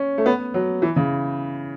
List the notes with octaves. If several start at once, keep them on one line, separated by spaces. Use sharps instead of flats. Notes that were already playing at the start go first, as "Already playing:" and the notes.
Already playing: C#4
A3
B3
F#3
E3
C#3